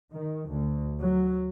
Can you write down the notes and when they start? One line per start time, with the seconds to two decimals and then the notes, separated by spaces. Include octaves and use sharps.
0.12 D#3
0.49 D2
1.00 F#3